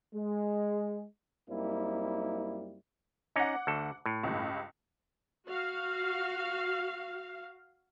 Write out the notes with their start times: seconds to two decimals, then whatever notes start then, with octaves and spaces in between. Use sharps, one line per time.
0.14 G#3
1.49 F#2 G3 A#3 C4 D#4 E4
3.36 C#4 D#4 F#5 D6
3.67 D2 A4
4.06 A2
4.23 C#2 G2
5.47 F#4 F5